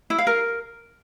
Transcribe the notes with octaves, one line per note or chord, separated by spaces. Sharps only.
E4
F5
A#4